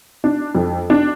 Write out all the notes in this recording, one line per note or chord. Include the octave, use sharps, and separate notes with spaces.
D4
F2
D4